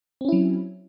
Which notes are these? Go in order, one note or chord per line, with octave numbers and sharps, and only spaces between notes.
F#3 C4 C#4 E4